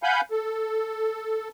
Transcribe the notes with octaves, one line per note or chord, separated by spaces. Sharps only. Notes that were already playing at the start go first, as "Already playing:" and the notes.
F5 F#5 G#5 B5 G6
A4